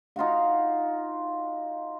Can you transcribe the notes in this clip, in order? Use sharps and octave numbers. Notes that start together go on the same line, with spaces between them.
D#4 F4 F#4 F5